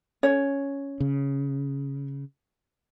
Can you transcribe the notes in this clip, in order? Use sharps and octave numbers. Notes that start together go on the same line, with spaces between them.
C#4 C#5
C#3